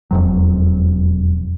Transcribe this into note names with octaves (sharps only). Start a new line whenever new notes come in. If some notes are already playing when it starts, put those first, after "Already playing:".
E1 F2 F#3